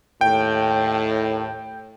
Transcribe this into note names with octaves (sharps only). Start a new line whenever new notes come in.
D#2 A2 G5